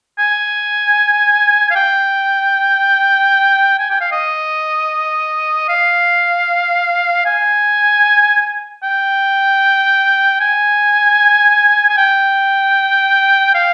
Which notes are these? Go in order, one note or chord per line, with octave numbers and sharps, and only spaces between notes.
G#5
F5
G5
G#5
G5
F5
D#5
F5
G#5
G5
G#5
G#5
G5
F5